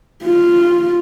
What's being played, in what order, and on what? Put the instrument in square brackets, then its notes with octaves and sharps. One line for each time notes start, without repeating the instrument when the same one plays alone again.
[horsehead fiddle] F4